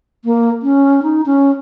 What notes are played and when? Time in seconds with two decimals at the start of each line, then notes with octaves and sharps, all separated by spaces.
0.25 A#3
0.62 C#4
1.03 D#4
1.26 C#4